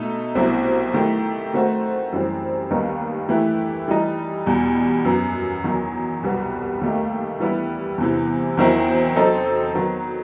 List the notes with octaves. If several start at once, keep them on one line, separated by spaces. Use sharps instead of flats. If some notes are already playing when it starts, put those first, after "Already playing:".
Already playing: B2 A3 D#4
C2 B2 F#3 C4 E4
D#3 A3 E4 G4
D#3 A3 C4 F#4 C5
F#2 E3 G3 C4
D#2 D#3 G3 B3 D#4
E3 A3 E4 G4 B4
E3 G3 D#4
E2 B2 G3
F#2 F#3 B3
E2 D#3 F#3
C2 B2 G3 B3 F#4
D#2 D#3 A3 D#4 G4
E3 G3 B3 E4
E2 C3 E3
E2 D#3 F#3 C4 E4
F#3 C4 D#4 A4 C5
D#3 F#3 B3